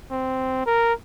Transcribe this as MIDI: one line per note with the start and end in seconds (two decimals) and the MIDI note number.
0.11 0.63 60
0.66 0.93 70